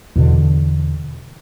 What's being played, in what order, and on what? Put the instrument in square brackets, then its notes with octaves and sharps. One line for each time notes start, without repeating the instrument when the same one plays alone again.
[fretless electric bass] E2 B2 D3